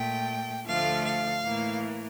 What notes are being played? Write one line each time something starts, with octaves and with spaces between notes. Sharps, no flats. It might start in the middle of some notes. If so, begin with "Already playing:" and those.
Already playing: A#2 A3 G5
D2 D3 F3 A3 F5
F5
A2 E3 A#3